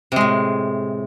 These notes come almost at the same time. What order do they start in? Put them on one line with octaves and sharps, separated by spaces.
C3 G#3 A2